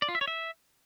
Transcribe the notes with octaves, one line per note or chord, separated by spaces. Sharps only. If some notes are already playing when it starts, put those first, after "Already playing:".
D5
F4
E5
C#5
E5